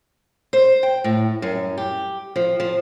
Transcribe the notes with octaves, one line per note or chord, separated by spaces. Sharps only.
C5
G5
A2
F#2
G4
F3
F3